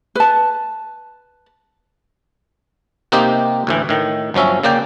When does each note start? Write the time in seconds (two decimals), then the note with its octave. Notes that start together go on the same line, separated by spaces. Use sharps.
0.15 B4 A5
3.12 C3 A#3 C4 D#4 G4
3.67 D2 A2 E3
3.89 A2 D#3
4.34 G1 F3 F#3 C#4 E5
4.63 C#3 A#3 D5 G5